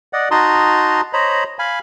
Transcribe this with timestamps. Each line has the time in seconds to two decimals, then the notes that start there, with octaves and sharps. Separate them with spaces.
0.13 D5 D#5 F#5
0.31 D#4 F#4 A5 A#5 C6 D#6
1.13 C5 C#5 D#5 A#5 B5
1.59 F5 G#5 B5